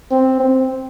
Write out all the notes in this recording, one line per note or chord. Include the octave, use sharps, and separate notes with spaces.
C4
C4